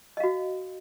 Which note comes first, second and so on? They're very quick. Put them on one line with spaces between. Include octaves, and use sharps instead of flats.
D#5 F5 F#4